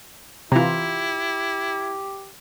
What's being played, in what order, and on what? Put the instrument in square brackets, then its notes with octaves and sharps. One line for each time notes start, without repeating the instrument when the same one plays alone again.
[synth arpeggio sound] C3 E3 [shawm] E4 [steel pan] F4 A#5 [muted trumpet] G4